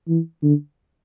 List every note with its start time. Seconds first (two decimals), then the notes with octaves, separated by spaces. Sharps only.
0.09 E3
0.43 D3